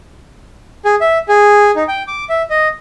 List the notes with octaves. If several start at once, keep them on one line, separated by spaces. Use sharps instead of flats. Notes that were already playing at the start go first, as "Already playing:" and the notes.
G#4
E5
G#4
D#4
G5
D6
E5
D#5